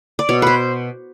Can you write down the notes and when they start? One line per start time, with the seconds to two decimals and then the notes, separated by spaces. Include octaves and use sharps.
0.19 D5
0.29 B2 C#5
0.42 B4 C5